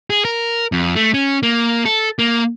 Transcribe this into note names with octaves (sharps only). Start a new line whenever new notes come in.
G#4
A#4
F2
A3
C#4
A#3
A4
A#3